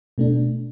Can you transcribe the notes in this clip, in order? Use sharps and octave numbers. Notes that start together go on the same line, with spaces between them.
B2 A3 D4